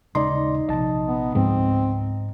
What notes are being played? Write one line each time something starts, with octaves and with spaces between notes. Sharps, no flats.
D#1 C#3 G#3 D#4 D5 C6
A#1 C3 F3 D#5 A5
B3
C#2 G#2 F3 B3 C4